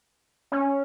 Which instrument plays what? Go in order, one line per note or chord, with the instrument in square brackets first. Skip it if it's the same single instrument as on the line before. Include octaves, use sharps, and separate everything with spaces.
[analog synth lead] C#4